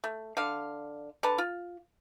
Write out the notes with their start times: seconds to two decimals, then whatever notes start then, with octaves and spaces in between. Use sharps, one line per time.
0.04 A3
0.37 D3 F5
1.23 D3 B4 A5
1.38 F4